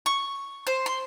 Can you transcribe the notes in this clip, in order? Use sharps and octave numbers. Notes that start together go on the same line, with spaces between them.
C#6
C5
C6